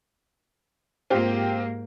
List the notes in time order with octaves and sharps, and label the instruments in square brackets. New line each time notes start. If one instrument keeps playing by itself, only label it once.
[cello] G#2 A#3 [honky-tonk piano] C4 F4 G4